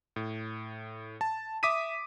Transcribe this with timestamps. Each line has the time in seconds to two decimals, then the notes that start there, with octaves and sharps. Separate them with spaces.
0.16 A2
1.21 A5
1.63 E5 D6 D#6 B6 D#7